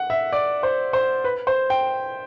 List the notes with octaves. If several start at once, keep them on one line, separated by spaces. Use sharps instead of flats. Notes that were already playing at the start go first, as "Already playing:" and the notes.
Already playing: F#5
E5
D5
C5
C5
B4
C5
G5